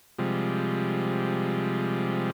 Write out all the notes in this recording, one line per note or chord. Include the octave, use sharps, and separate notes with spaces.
C3 F3 G3 G#3